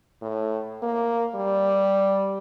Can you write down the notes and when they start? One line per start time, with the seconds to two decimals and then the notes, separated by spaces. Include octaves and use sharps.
0.22 A2
0.83 A#3
1.35 G3